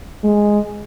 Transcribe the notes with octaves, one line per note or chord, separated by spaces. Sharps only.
G#3